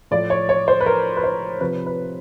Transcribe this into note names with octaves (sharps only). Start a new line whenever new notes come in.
A2 F3 D5
C#5
C#5
C5
B4
A#4
B4
C5
C3 F3 B4
B4